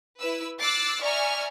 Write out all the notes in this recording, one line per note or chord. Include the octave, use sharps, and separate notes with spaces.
E4 B4 E6
D6 E6 F#6 A6 C7
D5 E5 G#5 A#5 C#6 F6